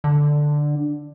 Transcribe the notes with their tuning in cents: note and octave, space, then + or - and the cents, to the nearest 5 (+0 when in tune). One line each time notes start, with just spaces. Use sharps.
D3 +5